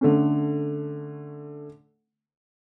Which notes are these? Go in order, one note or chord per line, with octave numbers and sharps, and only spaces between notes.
D3 A3 C#4